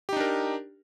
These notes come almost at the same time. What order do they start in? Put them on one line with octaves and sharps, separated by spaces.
G4 D#4 D4 A#4